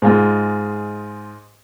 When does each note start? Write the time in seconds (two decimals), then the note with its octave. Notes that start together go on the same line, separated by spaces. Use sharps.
0.02 G#2 G#3 F4